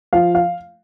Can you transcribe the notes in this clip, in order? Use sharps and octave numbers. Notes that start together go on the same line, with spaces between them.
F3 F5
F5